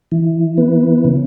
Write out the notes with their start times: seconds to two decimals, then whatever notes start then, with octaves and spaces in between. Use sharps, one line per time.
0.12 E3
0.58 B3
1.05 C#3